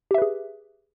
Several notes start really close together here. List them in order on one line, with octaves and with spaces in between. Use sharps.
G4 E5 B4 G#4